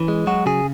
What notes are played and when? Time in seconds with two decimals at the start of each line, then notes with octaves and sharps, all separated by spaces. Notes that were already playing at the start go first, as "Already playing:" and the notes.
Already playing: E3 C#4
0.08 G#3
0.27 F#3 F#4
0.46 C#3 G#4